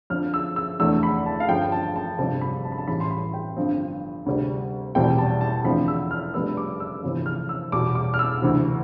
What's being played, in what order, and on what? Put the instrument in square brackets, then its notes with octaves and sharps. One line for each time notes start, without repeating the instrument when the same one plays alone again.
[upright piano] F2 D3 F3 F6
E6
E6
F1 E2 D3 A3 E6
B5
A5
F5
G1 G2 F3 G5
A5
A5
G1 F2 C3 G3 A5
B5
A5
B5
A5
A1 A2 E3 G3 B5
C6
B5
G5
G1 G2 D3 F3 C4
D2 C3 G3
F1 E2 B2 G3 C4 G5
A5
A5
F1 E2 D3 F3 C4 B5
E6
F6
F1 F2 D3 G3 B3 E6
D6
E6
G1 F2 C3 E3
F6
E6
E2 B2 G3 D6
D6
F6
E6
D2 C3 E3